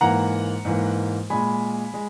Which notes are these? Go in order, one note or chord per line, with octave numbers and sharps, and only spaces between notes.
G#2 E3 A#3 F#5 A#5
G#2 E3 A#3
A#2 G#3 G#5 B5
G#3